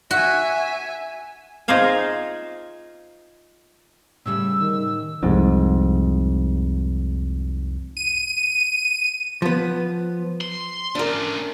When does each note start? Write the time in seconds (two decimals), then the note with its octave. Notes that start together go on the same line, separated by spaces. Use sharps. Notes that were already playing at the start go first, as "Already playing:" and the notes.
0.11 F#4 E5 G#5
1.68 D#4 F4 G#4 C5 F5 G#5
4.26 A2 C#3 G3 E6
4.60 D#3
5.23 C2 F2 G#2
7.97 D#7
9.42 F3 B3
10.41 C6
10.95 A3 C#4 D4 A#4